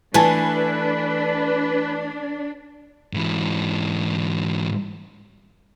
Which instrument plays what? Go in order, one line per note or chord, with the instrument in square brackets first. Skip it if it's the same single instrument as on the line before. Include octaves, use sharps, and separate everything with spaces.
[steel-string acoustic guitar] E3 A3 [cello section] D4 [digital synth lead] B4 [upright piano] G#5 A5
[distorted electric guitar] G#2 E3